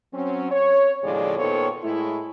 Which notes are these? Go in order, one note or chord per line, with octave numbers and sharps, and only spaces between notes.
F#3 C4 C#4
C#5
D#2 A2 C#3 F3 G#3 D5
A#2 D#3 B3 A4 C5 C#5
A2 G#3 A3 E4